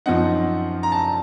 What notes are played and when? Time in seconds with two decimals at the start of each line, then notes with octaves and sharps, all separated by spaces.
0.06 F#2 F3 C4 D#4 F#5
0.83 A#5
0.92 A5